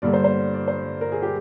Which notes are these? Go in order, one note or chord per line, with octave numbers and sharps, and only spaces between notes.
G2 D3 G3 A#3 D5
C5
C5
D5
C5
A#4
G#4
G4